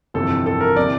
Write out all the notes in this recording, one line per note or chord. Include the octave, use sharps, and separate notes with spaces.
G1 F2 C3 E3 A4
A4
A#4
C3 E3 D5